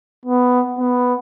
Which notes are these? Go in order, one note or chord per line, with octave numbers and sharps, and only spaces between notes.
B3
B3